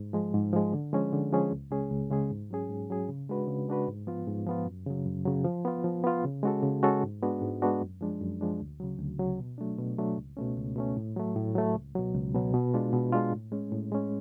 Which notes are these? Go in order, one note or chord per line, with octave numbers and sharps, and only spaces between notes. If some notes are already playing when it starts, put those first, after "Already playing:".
Already playing: G#2
F3 G#3
G#2
F3 G#3
D3
F3 G#3 C#4 G#4
D3
F3 G#3 C#4 G#4
C#2
C#3 G#3 C#4 G#4
C#2
C#3 G#3 C#4 G#4
G#2
F#3 C#4 G#4
G#2
F#3 C#4 G#4
C#3
G#3 D4 F#4 B4
C#3
G#3 D4 F#4 B4
G#2
F3 B3 F4
G#2
F3 B3 F4
F#2
C#3 F#3
F#2
C#3 F#3
F3
B3 F4
F3
B3 F4
C#3
G#3 C#4 F#4 A4
C#3
G#3 C#4 F#4 A4
G#2
G#3 B3 D4 F#4
G#2
G#3 B3 D4 F#4
F#2
F3 G#3 D4
F#2
F3 G#3 D4
D2
C#3 F#3
D2
C#3 F#3
B2
F#3 A3 D4
B2
F#3 A3 D4
C#2
B2 A3 C#4
C#2
B2 A3 C#4
A2
F#3 A3
A2
F#3 A3
C#2
B2 F#3
C#2
B2 F#3
B2
G#3 D4 F4
B2
G#3 D4 F4
A2
G#3 C#4
A2
G#3 C#4